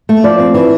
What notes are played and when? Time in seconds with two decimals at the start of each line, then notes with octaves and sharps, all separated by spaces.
0.09 A3
0.24 F3 D5
0.39 C4
0.54 E3